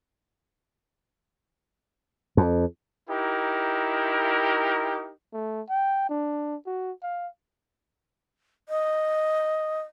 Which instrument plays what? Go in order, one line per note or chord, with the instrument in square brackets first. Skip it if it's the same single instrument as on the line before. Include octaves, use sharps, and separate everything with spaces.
[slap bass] F2
[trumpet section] D#4 E4 G4 A#4
[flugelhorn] A3
G5
D4
F#4
F5
[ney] D#5